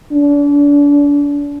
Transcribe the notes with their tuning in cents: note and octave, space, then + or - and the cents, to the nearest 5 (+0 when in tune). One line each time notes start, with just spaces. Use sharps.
D4 -35